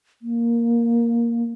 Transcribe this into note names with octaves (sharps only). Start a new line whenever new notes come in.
A#3